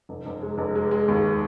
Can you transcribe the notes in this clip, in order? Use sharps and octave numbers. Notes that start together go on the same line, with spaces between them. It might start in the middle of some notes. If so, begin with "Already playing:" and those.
F1
F1
G#3
F1
G#3
G#3
D#2